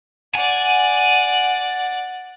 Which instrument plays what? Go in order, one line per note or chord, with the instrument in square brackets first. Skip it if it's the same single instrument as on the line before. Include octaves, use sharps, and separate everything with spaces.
[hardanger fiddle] D5 F#5 [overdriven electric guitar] G#5